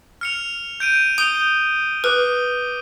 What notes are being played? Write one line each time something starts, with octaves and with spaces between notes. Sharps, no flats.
F6 C#7 F7
G6 D7 D#7
D#6 G6 D7 F7 G7
B4 D6 D#6 F6